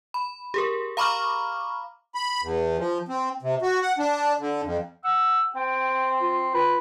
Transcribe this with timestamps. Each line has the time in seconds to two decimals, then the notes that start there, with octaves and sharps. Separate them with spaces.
0.14 B5
0.54 G4 G#4 A#4
0.97 F5 A#5 B5 C#6 D6 F6
2.15 B5
2.42 E2
2.78 F3
3.08 C4
3.42 C3
3.62 F#4
3.82 F#5
3.99 D4
4.39 D3
4.63 F2
5.04 F#5 E6
5.56 C4 G5
6.21 F4
6.54 F4 B4